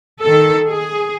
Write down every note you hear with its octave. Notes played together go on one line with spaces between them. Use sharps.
D#3 A4
G#4